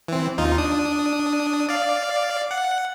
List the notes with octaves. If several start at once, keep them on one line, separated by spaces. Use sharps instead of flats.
E3 C4
D#2 D#4 F4
D4 D#6
D5 F5
F#5